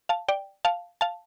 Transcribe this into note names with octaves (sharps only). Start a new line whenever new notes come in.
F5 A5
D5 G5
F5 A5
F5 A5